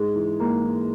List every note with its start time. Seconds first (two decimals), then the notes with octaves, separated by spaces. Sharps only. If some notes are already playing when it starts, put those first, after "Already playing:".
Already playing: G#2 G#3
0.15 E3
0.40 G#2 A#3
0.64 E3